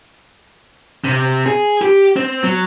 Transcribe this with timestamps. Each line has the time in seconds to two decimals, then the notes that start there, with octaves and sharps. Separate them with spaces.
1.04 C3
1.46 G#4
1.82 G4
2.16 C4
2.44 F#3